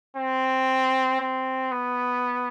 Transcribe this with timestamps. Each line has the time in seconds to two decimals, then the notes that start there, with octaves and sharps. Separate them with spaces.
0.16 C4
1.20 C4
1.71 B3